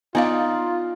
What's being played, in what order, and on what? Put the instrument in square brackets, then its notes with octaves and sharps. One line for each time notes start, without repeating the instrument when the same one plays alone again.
[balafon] B3 F5 [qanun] D#4 D5 [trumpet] F4